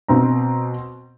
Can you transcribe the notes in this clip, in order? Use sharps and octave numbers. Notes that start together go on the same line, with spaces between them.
B2 C4 A#5